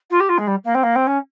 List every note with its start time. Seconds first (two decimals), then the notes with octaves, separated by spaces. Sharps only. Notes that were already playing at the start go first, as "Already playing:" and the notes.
0.10 F4
0.20 G4
0.29 F4
0.38 G#3
0.47 G3
0.64 A#3
0.74 C4
0.83 A#3
0.95 C4
1.07 C#4